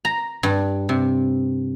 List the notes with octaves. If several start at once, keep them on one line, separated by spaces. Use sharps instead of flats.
A#5
G2
C3